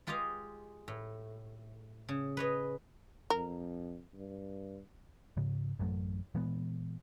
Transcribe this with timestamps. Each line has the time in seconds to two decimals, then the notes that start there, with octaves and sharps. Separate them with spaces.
0.07 G#3 F4 G4 G#4 D#5 F5
0.88 A2
2.09 C#3
2.37 B4 C#5 D#5
3.30 F2 A#4
4.14 G2
5.37 G#2 C#3
5.79 A1 F#2 F#3 A3
6.35 A#2 E3 G#3 B3